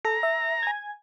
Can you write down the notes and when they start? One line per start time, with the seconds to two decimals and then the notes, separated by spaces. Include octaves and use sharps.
0.05 A4 A#5
0.23 E5
0.63 G#5 G#6